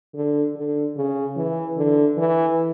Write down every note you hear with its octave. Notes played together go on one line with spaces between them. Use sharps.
D3
D3
C#3
E3
D3
E3